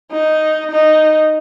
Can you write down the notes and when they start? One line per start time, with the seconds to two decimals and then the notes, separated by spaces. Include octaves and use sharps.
0.12 D#4
0.71 D#4